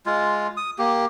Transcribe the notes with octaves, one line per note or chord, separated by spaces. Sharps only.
G#3 F4
D#6
A#3 G4